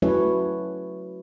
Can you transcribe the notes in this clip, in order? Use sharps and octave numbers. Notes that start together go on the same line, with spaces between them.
F#3 A3 C#4 E4 B4 C#5